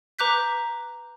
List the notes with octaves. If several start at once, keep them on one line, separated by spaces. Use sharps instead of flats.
B4 A#5 D6 F#6 G6 B6